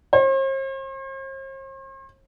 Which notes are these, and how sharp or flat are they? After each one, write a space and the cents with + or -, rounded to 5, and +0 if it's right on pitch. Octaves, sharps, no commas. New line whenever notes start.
C5 +45